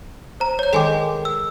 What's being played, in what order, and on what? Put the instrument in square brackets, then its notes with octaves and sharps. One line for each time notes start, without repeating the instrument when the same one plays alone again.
[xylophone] C5 A#5
C#5 G6
[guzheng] D#3 G#3 [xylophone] A4 G#5 D6
[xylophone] E6